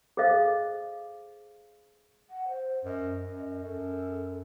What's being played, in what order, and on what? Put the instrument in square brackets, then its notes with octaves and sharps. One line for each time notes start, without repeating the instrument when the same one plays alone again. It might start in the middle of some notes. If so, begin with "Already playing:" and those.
[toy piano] G#4 A4 C5 D#5 F5
[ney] F#5
C5
[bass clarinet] F#2 [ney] D#5
[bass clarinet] F#2
[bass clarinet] F#2 [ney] A4